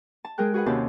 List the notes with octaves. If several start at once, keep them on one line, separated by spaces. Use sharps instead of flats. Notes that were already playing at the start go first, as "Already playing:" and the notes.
A5
G#3 G#4 A#4 G5 F#6
F#4 G#4 B4 F#5
D#2 C3 C#4 G4 E5 A5